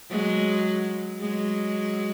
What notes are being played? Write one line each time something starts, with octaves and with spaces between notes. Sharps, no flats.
F#3 G#3
F#3 G#3